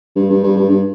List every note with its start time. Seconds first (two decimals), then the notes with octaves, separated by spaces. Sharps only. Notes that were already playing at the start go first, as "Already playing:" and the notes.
0.16 G2
0.30 G2
0.43 G2
0.56 G2
0.69 G2